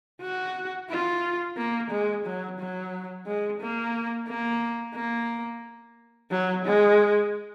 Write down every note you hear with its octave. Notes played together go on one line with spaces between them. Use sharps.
F#4
F4
A#3
G#3
F#3
F#3
G#3
A#3
A#3
A#3
F#3
G#3